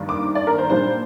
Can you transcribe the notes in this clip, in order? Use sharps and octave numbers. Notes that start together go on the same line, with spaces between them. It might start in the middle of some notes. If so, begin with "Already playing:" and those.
Already playing: G2 D#3 A#3 D4
D6
D5
A#4
C5
A#2 G3 A#3 D4 C5